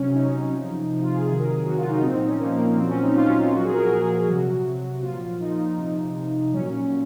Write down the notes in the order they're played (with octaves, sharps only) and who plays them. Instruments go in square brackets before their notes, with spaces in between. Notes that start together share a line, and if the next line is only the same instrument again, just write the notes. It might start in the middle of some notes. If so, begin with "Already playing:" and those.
Already playing: [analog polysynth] C3 F#3 C#4
C3 F#3 D#4
C3 F3
C3 F3
F4
G#4
C3 D#3 F#3 G#4
A#4
G#4
C3 D#3 F#3 F#4
F4
D#4
A#2 F3 C4
D#4
C#4
A#2 F3 A#3
A#3
A#2 F#3 C4
C#4
D#4
A#2 F#3 F4
C#4
F4
A#2 F3 F#4
G#4
A#4
G#4
A#2 F3 G#4
G#4
G#4
C3 F#3 F#4
C3 F#3
A#2 F3 F4
A#2 F3 D#4
C3 F3
C3 F3
A#2 F#3 C#4
A#2